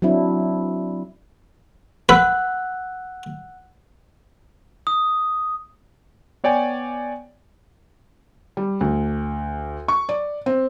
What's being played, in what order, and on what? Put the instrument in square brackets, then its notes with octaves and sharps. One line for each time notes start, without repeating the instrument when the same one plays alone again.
[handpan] F#3 C4 D4 E4
[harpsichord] B4 [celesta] F#5 E6 F#6
[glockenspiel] D#6
[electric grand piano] B3 C#5 D5 G5 G#5
[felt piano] G3
D2
C#6
D5
C4